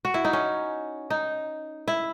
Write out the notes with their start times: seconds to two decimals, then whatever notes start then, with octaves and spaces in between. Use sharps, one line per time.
0.05 F#4
0.14 E4
0.25 D#4
0.33 C#4
1.10 D#4
1.88 E4